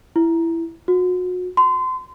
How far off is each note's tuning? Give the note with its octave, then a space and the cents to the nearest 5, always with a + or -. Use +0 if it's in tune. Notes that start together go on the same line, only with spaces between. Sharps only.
E4 +10
F#4 -30
C6 -30